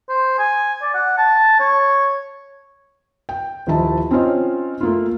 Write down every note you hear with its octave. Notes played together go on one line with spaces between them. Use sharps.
C5
G#5
D5
F#5
A5
C#5
G5
D#1 F3 D#4 E4 A5
C4 C#4 D#4 F4 C#5 D#5
A3 A#3 F4